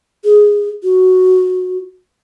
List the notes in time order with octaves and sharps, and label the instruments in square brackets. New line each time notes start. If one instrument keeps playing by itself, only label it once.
[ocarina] G#4
F#4